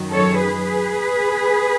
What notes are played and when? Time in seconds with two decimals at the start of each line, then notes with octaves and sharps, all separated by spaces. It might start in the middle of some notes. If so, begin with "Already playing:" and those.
Already playing: F#2 D#3 F#3
0.13 A4 C#5
0.45 G#4 B4